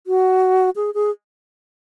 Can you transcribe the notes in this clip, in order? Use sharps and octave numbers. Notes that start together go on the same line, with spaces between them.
F#4
G#4
G#4